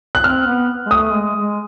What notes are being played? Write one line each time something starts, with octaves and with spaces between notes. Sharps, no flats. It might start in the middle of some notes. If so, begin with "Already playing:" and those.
F#6
C4 F6
B3
G#3
A3 D#6
G#3
G#3